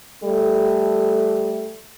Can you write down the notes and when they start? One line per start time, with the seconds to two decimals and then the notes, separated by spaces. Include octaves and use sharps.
0.24 G3 A3 A4